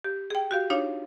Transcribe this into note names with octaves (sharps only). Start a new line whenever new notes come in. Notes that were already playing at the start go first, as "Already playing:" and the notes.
G4
G#4 G5
F#4 G4 F5
D4 D#4 F4 C#5 F5